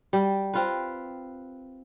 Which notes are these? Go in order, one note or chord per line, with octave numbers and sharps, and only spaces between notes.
G3
C4 F4 B4